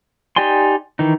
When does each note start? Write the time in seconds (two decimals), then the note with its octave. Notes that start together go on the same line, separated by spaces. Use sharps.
0.36 D#4 G4 D5 G#5 C6
0.99 D#3 E3 D#4